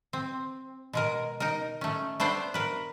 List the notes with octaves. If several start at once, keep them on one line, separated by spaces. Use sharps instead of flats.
C4
B2 G#3 A#4
D#4 A#4
A3 C#4
A3 B3 D4 C5 G5
A#4 B4